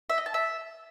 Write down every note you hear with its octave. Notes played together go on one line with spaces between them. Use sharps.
E5
D#5
A5
E5